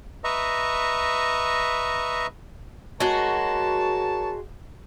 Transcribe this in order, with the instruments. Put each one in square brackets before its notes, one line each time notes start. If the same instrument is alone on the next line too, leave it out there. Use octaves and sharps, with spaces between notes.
[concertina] B4 D#5 E5 A#5 C#6
[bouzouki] G#3 F#4 [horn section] A#4 C#5 A5